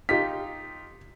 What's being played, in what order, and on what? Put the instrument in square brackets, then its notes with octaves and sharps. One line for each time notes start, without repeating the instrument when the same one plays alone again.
[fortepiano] D#4 F4 G4 [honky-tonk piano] B6